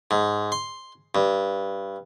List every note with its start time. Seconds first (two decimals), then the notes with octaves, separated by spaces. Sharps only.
0.11 G#2
0.52 C6
1.15 G2